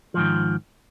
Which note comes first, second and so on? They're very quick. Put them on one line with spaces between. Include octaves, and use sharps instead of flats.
F3 G#2 D#3